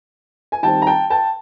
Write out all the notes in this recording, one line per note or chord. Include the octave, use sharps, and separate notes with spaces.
G#5
D#3 G3 C4 G5 A5
A#5
G5 A5
G5 A5